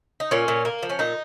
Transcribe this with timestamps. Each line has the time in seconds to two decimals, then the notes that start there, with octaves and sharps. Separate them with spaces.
0.20 D#4
0.31 A#2 C#4
0.48 A#2
0.65 A#3
0.83 F3
0.90 C#4
0.99 A#2 D#4